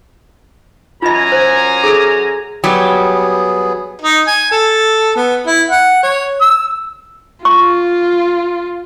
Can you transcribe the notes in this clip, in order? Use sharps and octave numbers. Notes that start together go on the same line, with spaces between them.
F#2 F4 D#5 G#5 A#5
C5
G#4 A4
F#3 G3 B3 G4 G#4
D#4
G#5
A4
B3
E4
F#5
C#5
E6
F4 C#6